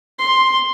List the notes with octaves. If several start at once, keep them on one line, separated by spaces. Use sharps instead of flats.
C6